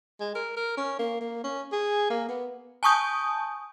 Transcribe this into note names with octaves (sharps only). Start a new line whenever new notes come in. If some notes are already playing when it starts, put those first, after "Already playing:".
G#3
A#4
A#4
C#4
A#3
A#3
C#4
G#4
A#3
B3
G#5 A5 C#6 D#6 G6